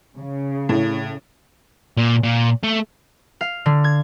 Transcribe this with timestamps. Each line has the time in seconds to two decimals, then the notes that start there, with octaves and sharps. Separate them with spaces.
0.16 C#3
0.69 A2
1.97 A#2
2.23 A#2
2.64 A3
3.41 F5
3.66 D3
3.84 G#6